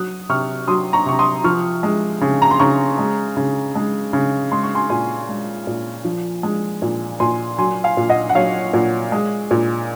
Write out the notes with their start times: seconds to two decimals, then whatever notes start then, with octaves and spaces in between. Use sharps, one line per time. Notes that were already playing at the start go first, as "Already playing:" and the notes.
Already playing: F#3 D#6 F#6
0.29 C3 C#6 F6
0.68 F#3 C6 D#6
0.93 A#5 C#6
1.06 C3 C#6
1.19 C6 D#6
1.44 F3 C#6 F6
1.83 G#3
2.21 C#3
2.42 A#5
2.51 C6
2.59 C#3 A#5 C#6
2.99 G#3
3.37 C#3
3.75 G#3
4.13 C#3
4.52 G#3 C6
4.63 C#6
4.75 G#5 C6
4.89 A#2 G#5 C6
5.29 G#3
5.67 A#2
6.05 F3
6.43 G#3
6.82 A#2
7.20 A#2 G#5 C6
7.58 F#3 G#5 C6
7.84 F5 G#5
7.97 A#2
8.09 D#5 F#5
8.29 F#5
8.35 F#3 C#5 F5
8.74 A#2
9.12 G#3
9.51 A#2